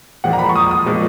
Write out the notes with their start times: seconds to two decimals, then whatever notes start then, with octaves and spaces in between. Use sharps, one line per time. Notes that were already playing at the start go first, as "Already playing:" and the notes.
0.24 A#2 F3 G#3 F#5
0.33 A#5
0.39 B5
0.49 C#6
0.56 D#6
0.71 D#6
0.86 A#2 F3 G#3